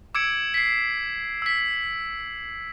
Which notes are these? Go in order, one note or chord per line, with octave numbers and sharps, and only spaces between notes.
D6 E6 G#6 C#7 D7
B6 C7
E6 B6